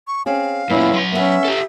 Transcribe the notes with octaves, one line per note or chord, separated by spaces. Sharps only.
C#6
C4 C#4 G#4 F5
F#2 A#2 B3 C#4 E4
F#3 C6
B3 C#4 B4 E5 F#5
G4 A4